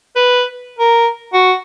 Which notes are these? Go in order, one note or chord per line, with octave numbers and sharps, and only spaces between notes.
B4
A#4
F#4